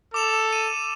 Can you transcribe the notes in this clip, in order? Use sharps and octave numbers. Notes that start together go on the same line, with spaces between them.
A4 D6 E7 F7
D#7